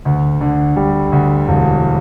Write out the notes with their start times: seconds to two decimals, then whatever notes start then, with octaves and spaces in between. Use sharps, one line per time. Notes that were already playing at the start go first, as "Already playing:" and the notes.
0.05 D2
0.41 D3
0.76 G3
1.12 D2
1.48 E1